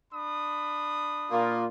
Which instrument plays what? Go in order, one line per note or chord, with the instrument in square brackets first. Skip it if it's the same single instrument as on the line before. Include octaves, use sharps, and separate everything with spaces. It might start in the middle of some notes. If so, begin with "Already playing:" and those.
[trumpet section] D4 B5 D#6
[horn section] A#2 A#3 F4